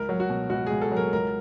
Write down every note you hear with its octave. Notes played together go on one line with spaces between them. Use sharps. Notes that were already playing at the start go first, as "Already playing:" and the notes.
Already playing: C#2 A#4
F#3
F#4
B2
C#2 F#4
C#2 G#4
A4
F#3 A#4
C#2 A#4